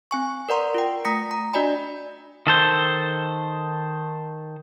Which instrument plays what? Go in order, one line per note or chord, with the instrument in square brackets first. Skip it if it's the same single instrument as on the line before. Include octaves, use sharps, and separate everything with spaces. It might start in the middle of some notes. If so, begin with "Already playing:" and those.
[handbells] C4 G#5 C#6
A#4 B4 D5 F#5 A#5 C6
F4 G5
A3 A#5 D#6 A#6 B6 C#7
A#5
D4 F#4 D5 D#5 G#5 B5
[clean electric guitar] D#3 A4 C5